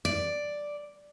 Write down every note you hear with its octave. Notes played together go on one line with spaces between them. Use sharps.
D5